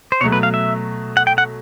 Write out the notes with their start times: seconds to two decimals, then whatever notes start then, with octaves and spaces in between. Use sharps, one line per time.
0.12 C5
0.21 B2 F#3 A3 C#5
0.32 B4
0.43 F5
0.54 E5
1.17 F#5
1.27 G5
1.38 F#5